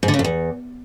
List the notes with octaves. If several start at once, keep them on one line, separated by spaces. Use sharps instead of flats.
G#2
D3
C#3
F2
E2